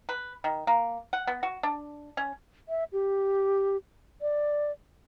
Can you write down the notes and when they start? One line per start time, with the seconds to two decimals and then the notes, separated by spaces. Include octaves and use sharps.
0.09 B4
0.44 D#3
0.67 A#3
1.13 F#5
1.27 B3
1.43 F#4
1.63 D4
2.17 C#4
2.69 E5
2.93 G4
4.21 D5